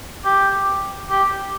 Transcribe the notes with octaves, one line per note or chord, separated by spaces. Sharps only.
G4
G4